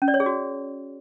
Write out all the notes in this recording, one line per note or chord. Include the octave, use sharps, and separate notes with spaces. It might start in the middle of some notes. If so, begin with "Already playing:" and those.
C#4
D5
C#5
G#4
F#4